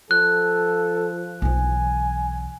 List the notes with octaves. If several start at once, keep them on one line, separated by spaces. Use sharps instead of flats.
F3 A4 F#6
B1 E3 G#5